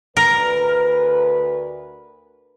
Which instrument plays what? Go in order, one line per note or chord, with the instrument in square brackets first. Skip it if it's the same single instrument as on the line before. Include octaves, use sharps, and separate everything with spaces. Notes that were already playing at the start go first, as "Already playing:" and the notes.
[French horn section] D2 B4 [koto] A#4